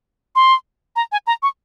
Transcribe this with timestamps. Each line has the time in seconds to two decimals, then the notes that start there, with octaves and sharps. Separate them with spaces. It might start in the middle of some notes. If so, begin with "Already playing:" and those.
0.36 C6
0.96 A#5
1.12 G#5
1.27 A#5
1.43 C#6